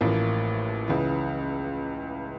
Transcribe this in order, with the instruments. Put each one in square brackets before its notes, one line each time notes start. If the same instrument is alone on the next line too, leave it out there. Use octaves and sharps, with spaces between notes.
[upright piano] A1 A2 F3 A#3
C#2 C#3 E3